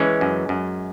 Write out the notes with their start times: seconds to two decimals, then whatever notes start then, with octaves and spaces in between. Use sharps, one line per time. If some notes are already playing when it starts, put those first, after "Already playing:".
Already playing: E3 G#3 C#4
0.21 F#2
0.49 F#2